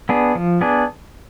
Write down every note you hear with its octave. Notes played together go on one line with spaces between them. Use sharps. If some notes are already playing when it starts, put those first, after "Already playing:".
B3 D4 G#4
F3
B3 D4 G#4